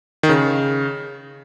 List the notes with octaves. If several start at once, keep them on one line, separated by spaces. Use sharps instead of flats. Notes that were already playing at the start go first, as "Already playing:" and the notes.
D#3
C#3